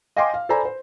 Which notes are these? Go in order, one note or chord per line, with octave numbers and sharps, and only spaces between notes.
D#5 F5 G5 G#5 C6 D6
F5
A4 C5 D5 G#5 A#5 B5
C5